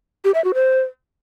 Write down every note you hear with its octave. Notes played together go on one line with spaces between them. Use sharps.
G4
E5
F#4
C5